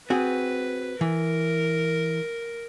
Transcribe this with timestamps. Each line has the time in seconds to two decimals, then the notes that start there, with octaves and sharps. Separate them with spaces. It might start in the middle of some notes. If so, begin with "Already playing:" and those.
0.10 C4 F#4 G#4 B4
1.01 E3 A#4